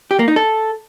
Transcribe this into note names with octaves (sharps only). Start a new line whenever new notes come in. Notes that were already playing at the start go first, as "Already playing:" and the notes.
G4
A#3
D#4
A4